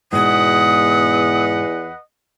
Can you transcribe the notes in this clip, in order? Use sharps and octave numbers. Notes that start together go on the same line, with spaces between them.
E2 G#2 B2 B4 D#5 F#5 D#6